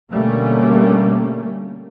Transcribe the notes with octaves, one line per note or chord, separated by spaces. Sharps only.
B2 D3 G3 A3 A#3 C#4